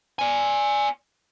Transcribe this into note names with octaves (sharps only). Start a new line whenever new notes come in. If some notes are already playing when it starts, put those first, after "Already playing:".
D5 G#5